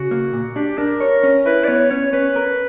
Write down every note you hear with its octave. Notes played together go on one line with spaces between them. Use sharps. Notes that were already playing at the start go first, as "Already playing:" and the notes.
Already playing: C#3 F#4
A#3
A#2
D4 G4
D4 A#4
C#5
C#4
E4 B4
D5
B3 C#5
C#4 C#5
C#4 B4
A#4